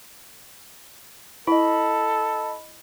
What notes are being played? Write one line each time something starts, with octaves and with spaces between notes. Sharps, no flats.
E4 A4 D#5 B5